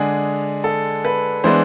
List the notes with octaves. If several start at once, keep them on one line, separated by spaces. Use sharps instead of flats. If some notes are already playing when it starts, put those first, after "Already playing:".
Already playing: D3 G#3 D4 G#4
A4
B4
E3 G#3 B3 D4 C5